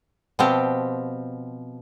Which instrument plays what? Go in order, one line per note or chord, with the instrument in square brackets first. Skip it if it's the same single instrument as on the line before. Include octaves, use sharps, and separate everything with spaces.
[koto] B2 F3 C4 G4